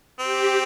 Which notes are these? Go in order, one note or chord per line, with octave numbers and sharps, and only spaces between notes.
C4 G4